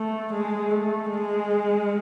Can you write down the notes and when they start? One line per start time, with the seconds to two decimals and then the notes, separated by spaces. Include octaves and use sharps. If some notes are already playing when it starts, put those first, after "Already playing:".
Already playing: A3
0.33 G#3
0.71 A3
1.11 G#3